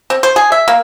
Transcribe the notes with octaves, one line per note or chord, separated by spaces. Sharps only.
C4
C5
G#4
E5
A#3